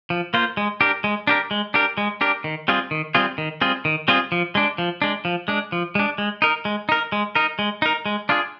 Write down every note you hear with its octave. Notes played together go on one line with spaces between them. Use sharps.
F3
A#3 F4 C5
G#3
D4 G4 A#4
G#3
D4 G4 A#4
G#3
D4 G4 A#4
G#3
D4 G4 A#4
D#3
G3 C4 F4 G#4
D#3
G3 C4 F4 G#4
D#3
G3 C4 F4 G#4
D#3
G3 C4 F4 G#4
F3
G#3 D4
F3
G#3 D4
F3
G#3 D4
F3
G#3 D4
G#3
D#4 A#4
G#3
D#4 A#4
G#3
D#4 A#4
G#3
D#4 A#4
G#3
D4 F4 G#4